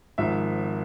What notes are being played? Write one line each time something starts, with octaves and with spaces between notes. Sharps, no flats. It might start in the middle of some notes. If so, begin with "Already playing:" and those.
G#1 G#2 F3 E5